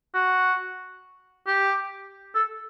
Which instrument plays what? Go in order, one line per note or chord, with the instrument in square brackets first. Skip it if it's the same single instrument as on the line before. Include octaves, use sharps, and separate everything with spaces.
[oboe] F#4
G4
A4